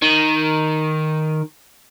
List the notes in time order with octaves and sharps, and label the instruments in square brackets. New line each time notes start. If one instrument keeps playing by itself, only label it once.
[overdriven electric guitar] D#3